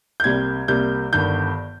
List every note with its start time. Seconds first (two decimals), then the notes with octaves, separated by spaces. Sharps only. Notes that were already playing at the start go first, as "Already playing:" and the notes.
0.20 G6
0.24 C2 C3 G3 A#3 G#6
0.68 C2 C3 G3 A#3 G6
1.13 G1 G2 D#3 G6